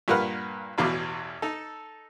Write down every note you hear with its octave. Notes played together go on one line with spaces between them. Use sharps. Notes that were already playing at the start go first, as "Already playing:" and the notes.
G2 A#2 A#3 A#4 B4 F#5
A1 E2 B2 E3 F5 D6
D#4 A4